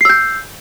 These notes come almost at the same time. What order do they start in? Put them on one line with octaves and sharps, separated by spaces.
C7 E6 G6